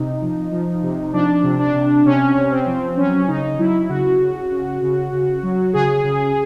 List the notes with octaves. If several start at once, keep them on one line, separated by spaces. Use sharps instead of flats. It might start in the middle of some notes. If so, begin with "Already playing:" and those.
Already playing: C3 D#4
F3
F3
C3
F3 D4
C3
D4
C3
C3 C#4
C3
C4
F3
F#3 C#4
C#3 D#4
F#3 E4
C#3 F#4
C#3
C#3
C#3
C#3
F#3
C#3 G#4
C#3